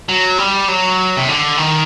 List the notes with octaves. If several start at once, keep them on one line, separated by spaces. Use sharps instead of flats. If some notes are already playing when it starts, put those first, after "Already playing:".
F#3
G3
F#3
C3
D3
D#3